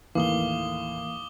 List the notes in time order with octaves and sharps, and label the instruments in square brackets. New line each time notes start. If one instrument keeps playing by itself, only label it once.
[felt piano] D#2 A2 [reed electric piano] E3 A#3 [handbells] F5 [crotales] D6 D#6 G7